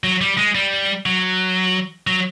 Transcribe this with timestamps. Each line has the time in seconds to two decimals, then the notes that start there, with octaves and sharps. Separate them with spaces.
0.04 F#3
0.21 G3
0.38 G#3
0.55 G3
1.06 F#3
2.07 F#3